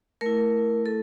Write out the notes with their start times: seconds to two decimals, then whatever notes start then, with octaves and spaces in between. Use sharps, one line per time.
0.21 A3 E4 A#4
0.86 A4